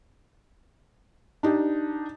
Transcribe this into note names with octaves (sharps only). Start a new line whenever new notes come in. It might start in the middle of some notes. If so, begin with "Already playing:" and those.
D4 D#4 G4